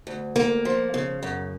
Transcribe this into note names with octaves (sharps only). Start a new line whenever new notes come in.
D2
A#3
F3
C#3
F#2